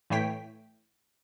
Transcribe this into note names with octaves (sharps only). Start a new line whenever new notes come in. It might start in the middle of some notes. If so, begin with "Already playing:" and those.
A2 E3 A3 C#5 G5 B6